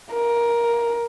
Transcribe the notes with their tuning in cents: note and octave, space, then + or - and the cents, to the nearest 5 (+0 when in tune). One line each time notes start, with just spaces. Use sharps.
A#4 +15